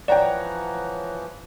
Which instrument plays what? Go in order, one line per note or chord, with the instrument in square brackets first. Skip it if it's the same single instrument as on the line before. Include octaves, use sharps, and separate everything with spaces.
[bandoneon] E3 F3 [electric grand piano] C#5 F#5 A#5 [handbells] D5 G5